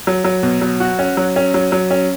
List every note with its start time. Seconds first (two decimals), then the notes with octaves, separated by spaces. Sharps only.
0.07 F#3
0.25 F#3
0.43 B2
0.61 F#3
0.80 F#4
0.99 C#4
1.17 F#3
1.36 C#4
1.54 F#3
1.72 F#3
1.91 C#4